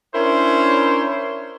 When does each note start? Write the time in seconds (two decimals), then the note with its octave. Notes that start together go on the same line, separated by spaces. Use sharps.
0.15 C#4 D4 E4 A#4 C5 C#5